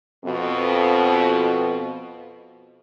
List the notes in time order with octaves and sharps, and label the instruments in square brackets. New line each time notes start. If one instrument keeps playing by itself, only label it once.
[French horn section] F2 B2